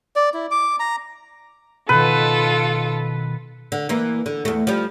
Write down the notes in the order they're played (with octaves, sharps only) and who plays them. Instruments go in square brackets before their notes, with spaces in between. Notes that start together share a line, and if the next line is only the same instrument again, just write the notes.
[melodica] D5
E4
D6
A#5
[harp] B2 D#3 [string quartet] F4 A4 [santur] B4
[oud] D3
E3 A#3
D3
E2 A3
F3 G3